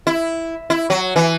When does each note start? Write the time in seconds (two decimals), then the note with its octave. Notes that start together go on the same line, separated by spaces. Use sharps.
0.07 E4
0.70 E4
0.90 F#3
1.16 E3